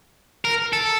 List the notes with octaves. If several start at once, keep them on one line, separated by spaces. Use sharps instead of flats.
A#4
A4